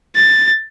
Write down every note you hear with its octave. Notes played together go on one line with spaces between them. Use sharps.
A6